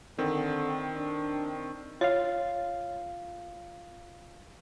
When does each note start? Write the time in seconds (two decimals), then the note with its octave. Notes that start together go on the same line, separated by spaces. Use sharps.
0.18 D3 D#3 C4
0.96 D4
2.01 F4 C#5 F5